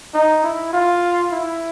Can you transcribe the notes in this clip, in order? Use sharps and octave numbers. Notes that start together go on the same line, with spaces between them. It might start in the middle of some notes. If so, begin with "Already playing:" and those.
D#4
E4
F4
E4